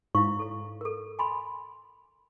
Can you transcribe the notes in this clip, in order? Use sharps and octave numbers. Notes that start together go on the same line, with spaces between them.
G#2 E4 F5 C#6
A4 C#5
A4 A#4
G#5 B5 C6